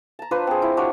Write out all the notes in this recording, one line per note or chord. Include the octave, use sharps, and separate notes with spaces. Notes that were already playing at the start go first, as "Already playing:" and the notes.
A5 A#5
D4 F4 B4 C5
C4 G#4
E4
D4 F4 F#4 C#5